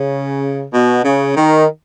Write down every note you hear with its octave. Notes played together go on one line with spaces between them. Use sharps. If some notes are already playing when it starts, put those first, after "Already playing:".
Already playing: C#3
B2
C#3
D#3